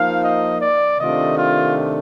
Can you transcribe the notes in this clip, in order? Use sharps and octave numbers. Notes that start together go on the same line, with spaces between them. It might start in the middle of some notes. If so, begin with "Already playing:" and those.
Already playing: F3 A#3 D#4 F5
D#5
D5
C3 D#3 A3 D4 F4 D#5
F4